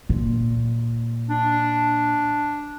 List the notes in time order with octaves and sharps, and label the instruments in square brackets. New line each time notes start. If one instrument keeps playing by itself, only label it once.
[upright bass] A#2
[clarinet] D4